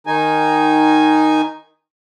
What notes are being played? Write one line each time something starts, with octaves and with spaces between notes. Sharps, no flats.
D#3 D#4 G#5